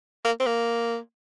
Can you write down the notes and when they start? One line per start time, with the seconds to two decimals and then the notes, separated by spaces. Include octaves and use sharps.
0.25 A#3
0.40 C4
0.46 A#3